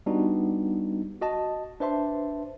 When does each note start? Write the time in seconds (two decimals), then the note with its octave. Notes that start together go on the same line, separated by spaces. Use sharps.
0.06 G3 B3 D4 D#4 F#4
1.21 F#4 D#5 A5
1.80 D4 B4 C5 E5 A5 C6